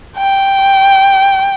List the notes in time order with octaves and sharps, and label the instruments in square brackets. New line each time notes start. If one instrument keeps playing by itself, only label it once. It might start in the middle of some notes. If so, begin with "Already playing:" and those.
[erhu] G5